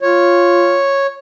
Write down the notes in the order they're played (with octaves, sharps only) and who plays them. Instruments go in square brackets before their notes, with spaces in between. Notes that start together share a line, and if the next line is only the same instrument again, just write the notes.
[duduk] F4 [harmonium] C#5